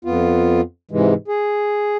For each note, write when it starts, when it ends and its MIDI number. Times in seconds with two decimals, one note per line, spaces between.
0.05 0.61 41
0.05 0.61 59
0.05 0.61 65
0.91 1.14 44
0.91 1.14 48
0.91 1.14 52
0.91 1.14 56
1.28 1.97 68